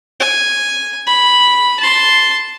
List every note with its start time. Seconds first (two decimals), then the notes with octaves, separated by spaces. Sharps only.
0.20 G#5
1.07 B5
1.80 A5 C6